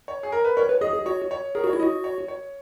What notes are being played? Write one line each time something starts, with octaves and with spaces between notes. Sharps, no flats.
C#5
G#4
A#4
B4
A#4 C#5
B4
G#4 D#5
G#4
F#4 C#5
C#5
G#4 A#4
F#4 C#5
E4
F#4 D#5
C#5
C#5